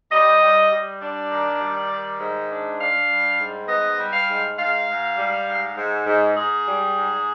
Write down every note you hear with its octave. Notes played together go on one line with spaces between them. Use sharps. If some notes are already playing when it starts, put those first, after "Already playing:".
G3 D#5
G3
G3
D4 D5
D#3
G3
D#3
G#2
D4
D4 F5
G3
G#2
B3 D#5
G3
F5
G#2
G#2 F5
G#2
G3
G#2
G#2
G#2
G#2 G#4
G3
G#2